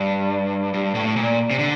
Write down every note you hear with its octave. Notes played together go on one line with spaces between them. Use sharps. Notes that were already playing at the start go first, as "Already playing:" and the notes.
Already playing: G2
G2
A2
A#2
C3
D3